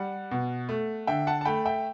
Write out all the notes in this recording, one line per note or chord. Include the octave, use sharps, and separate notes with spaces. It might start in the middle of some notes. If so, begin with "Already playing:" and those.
Already playing: G3 F#5
B2
A3
D3 E5 G5
F#5 A5
A5
A3 G5 B5
E5 G5